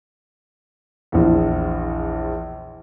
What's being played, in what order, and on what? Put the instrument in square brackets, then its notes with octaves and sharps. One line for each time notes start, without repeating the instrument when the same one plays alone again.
[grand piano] A#1 E2